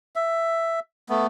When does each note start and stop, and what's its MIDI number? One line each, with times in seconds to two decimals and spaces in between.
0.16 0.80 76
1.09 1.27 57
1.09 1.27 59